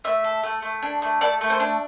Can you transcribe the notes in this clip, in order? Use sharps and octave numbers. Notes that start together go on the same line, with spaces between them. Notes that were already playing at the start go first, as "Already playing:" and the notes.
A3 E5
A4
A3
A3
D4
A3
A4 D5
A3
C5
D4